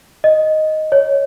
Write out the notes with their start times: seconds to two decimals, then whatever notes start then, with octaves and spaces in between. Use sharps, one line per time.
0.24 D#5
0.92 C#5